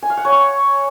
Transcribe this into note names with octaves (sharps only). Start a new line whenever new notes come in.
G#5
F5
F#5
C#5
C#6